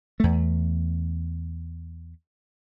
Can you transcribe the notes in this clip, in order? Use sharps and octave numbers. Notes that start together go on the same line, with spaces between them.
E2 A3